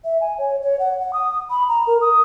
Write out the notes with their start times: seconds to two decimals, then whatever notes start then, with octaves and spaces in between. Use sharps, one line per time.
0.04 E5
0.21 G#5
0.38 C#5
0.62 C#5
0.79 F#5
1.01 F#5
1.13 D#6
1.50 B5
1.68 A#5
1.87 A#4
2.01 D#6